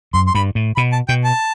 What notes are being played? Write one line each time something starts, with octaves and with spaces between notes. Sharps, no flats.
F#2 C6
C6
G2 B5
A2
B2 B5
A5
B2 G5
A5